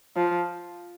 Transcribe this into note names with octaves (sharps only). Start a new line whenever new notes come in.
F3